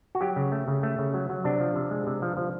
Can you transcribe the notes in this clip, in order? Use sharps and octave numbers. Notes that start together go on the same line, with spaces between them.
F#4
F#3 G4
C#3
A3
C#3
A3
C#3
F#3
F#3
C3 D4
F3
C3
G#3
C3
F3
F3